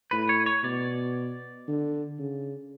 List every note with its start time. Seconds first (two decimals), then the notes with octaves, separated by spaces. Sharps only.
0.11 A2 B4
0.29 C#5
0.46 C#5
0.64 B2 D5
1.68 D3
2.19 C#3